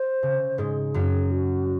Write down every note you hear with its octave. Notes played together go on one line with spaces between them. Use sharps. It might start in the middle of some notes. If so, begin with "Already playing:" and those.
Already playing: C5
C#3
G#2 G#3 G#4
F#2 F#3
F#4